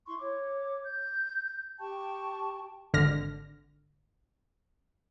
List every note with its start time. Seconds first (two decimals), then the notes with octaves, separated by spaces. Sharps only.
0.07 E4 C6 C#6
0.19 C#5 D6
0.84 G6
1.79 G4 G5 A5 C#6
2.94 G#1 D3 F6 A#6